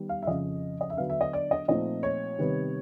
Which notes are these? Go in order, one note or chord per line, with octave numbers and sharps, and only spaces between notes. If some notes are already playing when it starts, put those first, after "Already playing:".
Already playing: D#3 G3 B3
F5
E5
F2 C#3 F3 D#5
D#5
E5
D3 F#3 B3 D4 F5
E5
D#5
D5
D#5
A#2 F3 A3 C4 D#4 D#5
C#5
C3 D#3 G3 B3